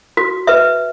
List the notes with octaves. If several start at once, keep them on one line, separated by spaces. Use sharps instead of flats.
F#4
B4 E5